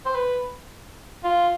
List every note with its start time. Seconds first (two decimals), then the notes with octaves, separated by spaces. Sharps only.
0.05 C5
0.15 B4
1.24 F4